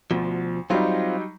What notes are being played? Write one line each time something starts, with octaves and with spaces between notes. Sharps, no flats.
D2 B2 F3
F#3 G3 C4 D#4 F4